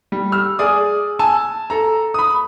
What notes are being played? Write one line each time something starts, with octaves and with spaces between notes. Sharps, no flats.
G3
E6 F6
G#4 D5 D#6
G#5 A5 E6
A4 A#5
B5 D#6